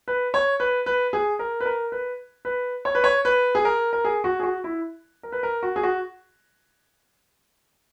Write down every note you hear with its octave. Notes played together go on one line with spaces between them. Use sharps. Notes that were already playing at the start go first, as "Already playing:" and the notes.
B4
C#5
B4
B4
G#4
A#4
B4
A#4
B4
B4
C#5
B4
C#5
B4
G#4
A#4
A#4
G#4
F#4
G#4
F#4
E4
A#4
B4
A#4
F#4
G#4
F#4